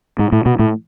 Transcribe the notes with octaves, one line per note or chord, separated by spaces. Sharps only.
G#2
A2
B2
A2